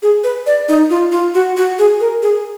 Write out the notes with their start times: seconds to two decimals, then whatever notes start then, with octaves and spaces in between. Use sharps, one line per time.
0.02 G#4
0.24 B4
0.46 D5
0.69 D#4
0.90 F4
1.12 F4
1.35 F#4
1.57 F#4
1.79 G#4
2.00 A#4
2.22 G#4